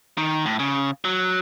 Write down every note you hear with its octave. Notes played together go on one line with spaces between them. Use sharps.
D#3
A2
C#3
F#3